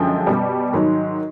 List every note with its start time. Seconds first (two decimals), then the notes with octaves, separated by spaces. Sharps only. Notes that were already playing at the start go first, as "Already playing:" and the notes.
Already playing: F#2 D3 F3 G#3 G5
0.27 B2 G3
0.73 G#2 D#3 F#3